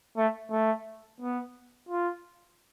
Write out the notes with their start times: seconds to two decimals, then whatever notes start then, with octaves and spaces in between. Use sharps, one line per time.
0.17 A3
0.51 A3
1.20 B3
1.89 F4